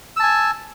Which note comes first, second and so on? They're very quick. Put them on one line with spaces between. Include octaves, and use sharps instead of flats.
E6 A5 G#5